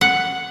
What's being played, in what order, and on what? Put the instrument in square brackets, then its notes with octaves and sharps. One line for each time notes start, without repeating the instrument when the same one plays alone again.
[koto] F#5